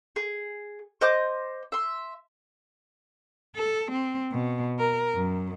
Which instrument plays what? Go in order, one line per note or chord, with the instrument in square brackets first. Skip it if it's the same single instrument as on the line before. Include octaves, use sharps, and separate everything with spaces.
[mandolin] G#4
C5 D#5 D6 G6
E5 C6
[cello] A4
C4
B2
A#4
F#2